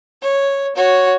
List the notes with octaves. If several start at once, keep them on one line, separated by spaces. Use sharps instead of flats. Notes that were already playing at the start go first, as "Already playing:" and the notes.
C#5
F#4 C#5